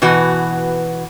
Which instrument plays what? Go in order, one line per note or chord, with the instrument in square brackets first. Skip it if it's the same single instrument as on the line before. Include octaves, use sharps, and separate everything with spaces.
[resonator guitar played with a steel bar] B2 E3 F#4 B4